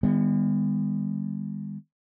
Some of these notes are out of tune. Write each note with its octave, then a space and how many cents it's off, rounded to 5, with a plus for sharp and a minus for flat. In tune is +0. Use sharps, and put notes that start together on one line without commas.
D#3 +0 G#3 -45 B3 +10